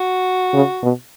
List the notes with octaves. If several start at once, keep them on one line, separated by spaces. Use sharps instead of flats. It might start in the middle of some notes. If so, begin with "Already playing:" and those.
Already playing: F#4
C#3
B2